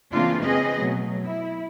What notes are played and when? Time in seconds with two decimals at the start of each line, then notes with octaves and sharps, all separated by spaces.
0.12 C#3 E3 A#3 C4 D4 F4
0.42 C4 C#4 G#4 B4 D#5
0.77 B2 F#3 A3
1.24 E4